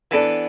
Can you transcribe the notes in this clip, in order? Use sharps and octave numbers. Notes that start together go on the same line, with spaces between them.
E3 B3 D4 A4